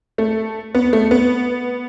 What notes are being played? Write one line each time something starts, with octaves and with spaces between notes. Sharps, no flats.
A3
B3
A3
B3